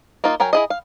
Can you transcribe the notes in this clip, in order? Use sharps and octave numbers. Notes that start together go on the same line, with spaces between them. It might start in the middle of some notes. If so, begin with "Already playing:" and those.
A#3 D#4 F4
F#3 A#4 G5 G#5
E4 G#4 D#5
F5